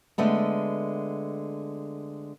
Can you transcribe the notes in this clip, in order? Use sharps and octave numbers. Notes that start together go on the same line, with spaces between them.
D3 G#3 A3 B3